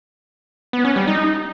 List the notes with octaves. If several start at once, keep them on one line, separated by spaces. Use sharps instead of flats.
B3
C#4
G3
D#4